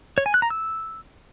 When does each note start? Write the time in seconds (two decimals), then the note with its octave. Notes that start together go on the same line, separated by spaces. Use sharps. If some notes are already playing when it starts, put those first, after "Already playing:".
0.18 C#5
0.26 G#5
0.34 F#6
0.42 A#5
0.50 E6